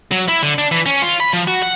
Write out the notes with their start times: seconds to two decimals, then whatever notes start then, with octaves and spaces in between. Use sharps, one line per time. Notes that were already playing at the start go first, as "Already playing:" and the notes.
0.11 F#3
0.28 E4
0.43 D3
0.58 D4
0.71 E3
0.86 C#4
1.02 F4
1.20 B5
1.33 F3
1.47 F#4
1.62 F#5